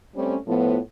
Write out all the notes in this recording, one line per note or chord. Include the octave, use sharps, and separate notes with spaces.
G3 A3 C4 C#4
A2 F3 B3